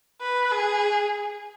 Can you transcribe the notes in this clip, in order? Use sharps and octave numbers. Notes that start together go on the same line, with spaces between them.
B4
G#4